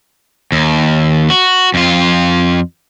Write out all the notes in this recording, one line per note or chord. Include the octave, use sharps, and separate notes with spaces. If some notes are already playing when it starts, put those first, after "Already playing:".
D#2
F#4
F2 F4